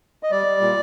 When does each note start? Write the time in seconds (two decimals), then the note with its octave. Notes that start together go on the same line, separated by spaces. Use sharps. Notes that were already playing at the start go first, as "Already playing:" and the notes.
0.23 D#5
0.31 G3 D5
0.46 G3
0.61 A#2